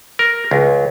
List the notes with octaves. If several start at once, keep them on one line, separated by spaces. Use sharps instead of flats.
A#4
C#2